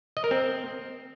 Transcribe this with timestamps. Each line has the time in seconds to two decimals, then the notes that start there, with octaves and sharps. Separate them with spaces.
0.17 D#5
0.24 A#4
0.31 C4